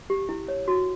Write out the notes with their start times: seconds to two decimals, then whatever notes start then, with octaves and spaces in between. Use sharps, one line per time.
0.10 G4
0.29 E4
0.48 C#5
0.68 F#4